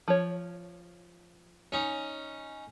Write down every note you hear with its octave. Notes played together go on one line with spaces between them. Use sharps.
F3 C#5
C#4 D#4